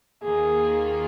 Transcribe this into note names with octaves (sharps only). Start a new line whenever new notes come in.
D#2 D#3 A#3 F4 G#4